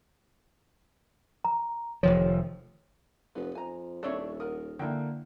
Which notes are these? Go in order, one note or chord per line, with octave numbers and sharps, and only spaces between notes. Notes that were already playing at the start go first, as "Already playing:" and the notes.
A#5
F1 D#3 F3 C#5
F1 B3
F2 G#5 A#5
D#1 C4 D4 E4 A4 C#5 E5
A#4 F#5 D#6
D3 A#3 E4 G5